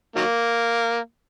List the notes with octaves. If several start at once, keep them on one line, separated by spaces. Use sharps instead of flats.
D#3 F#3 A#3